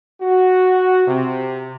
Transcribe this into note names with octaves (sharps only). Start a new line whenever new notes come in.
F#4
C3